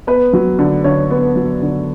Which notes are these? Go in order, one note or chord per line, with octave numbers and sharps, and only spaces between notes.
B3 B4
F#3
D3
D3 C#5
B3
F#3
D3